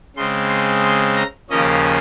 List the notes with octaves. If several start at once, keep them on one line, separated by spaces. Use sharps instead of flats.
C#3 G#3 C4 C6
C6
C6
A#5
D#2 C#3 F3 A#3 C#4 D#5